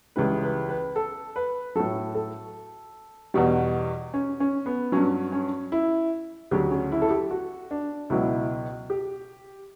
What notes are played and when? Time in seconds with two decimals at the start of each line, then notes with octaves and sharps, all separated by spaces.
0.16 C#2 C#3 E3 G3 B4
0.43 B4
0.69 B4
0.96 A4
1.36 B4
1.76 A2 F#3 A4
2.15 A4
3.34 E2 B2 G3
4.14 C#4
4.40 C#4
4.66 B3
4.92 G2 F#3 C#4
5.32 C#4
5.72 E4
6.51 D2 C#3 F#3 G4
6.71 C#4
6.92 E4
7.02 A4
7.10 G4
7.31 F#4
7.71 D4
8.10 C#2 B2 F#3 E4
8.90 G4